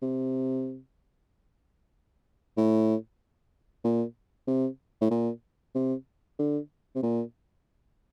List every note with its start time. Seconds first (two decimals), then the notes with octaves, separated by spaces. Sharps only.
0.02 C3
2.57 A2
3.84 A#2
4.48 C3
5.01 A2
5.11 A#2
5.75 C3
6.39 D3
6.95 C3
7.03 A#2